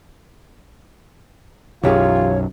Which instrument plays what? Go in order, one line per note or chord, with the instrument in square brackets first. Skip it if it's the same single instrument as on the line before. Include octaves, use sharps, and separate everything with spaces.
[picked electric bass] B1 F#2 [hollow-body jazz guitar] E3 G4 G#4 [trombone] F4 [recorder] C#5